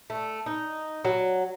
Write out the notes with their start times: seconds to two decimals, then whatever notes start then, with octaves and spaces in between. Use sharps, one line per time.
0.10 A3
0.46 D#4
1.05 F#3